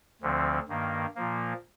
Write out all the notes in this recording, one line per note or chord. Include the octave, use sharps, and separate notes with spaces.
D2 D3 F3 C4
G2 D#3 A#3
A#2 F3 A#3